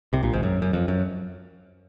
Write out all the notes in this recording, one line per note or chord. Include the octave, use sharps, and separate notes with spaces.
C2 C3
A#1 A#2
G#1 G#2
F#2
F#2
F2
F#2